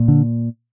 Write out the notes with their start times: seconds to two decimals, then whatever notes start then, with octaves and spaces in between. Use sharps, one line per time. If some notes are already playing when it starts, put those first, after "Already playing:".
Already playing: A#2
0.08 D3